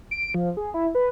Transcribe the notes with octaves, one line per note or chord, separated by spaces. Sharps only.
D7
F3
G#4
E4
B4